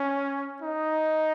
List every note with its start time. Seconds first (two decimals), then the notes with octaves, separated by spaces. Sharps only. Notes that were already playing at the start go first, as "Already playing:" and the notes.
Already playing: C#4
0.62 D#4